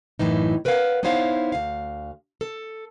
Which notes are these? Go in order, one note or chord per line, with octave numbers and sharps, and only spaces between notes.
F#2 A2 E3 D#4
A#4 B4 C#5 D#5 F5 F#5
B3 D#4 E4 C5 C#5 F5
D2 F5
A4